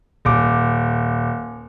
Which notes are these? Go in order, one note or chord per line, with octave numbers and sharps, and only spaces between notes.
D#1 D6